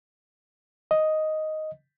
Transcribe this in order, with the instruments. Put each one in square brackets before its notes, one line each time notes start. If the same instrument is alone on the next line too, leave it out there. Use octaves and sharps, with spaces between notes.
[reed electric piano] D#5